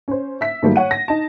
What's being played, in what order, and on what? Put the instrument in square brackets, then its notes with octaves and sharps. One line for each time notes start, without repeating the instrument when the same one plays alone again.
[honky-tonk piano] C#4 C5
E5 B6
G#2 D#3 F#3 G3 A3 A#3
C#5 F#5 D#7
A#6
D#4 A5